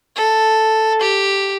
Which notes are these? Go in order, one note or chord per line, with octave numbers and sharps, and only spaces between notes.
A4
G4